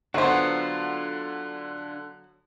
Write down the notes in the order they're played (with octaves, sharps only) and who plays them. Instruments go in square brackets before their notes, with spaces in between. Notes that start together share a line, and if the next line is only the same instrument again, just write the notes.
[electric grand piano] D3 [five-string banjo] F#3 B3 [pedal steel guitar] D4 F4 [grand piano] C5 F#5